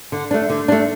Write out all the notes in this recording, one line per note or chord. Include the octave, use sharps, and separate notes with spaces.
D3
A3 D4
D3
A3 D4